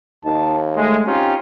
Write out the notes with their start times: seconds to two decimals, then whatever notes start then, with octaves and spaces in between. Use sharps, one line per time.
0.25 D#2 D#4 A5
0.76 G#3 A3 G#4
1.06 C4 C#4 D#4 F4 G4